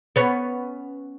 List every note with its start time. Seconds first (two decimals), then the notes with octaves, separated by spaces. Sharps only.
0.16 B3 C#4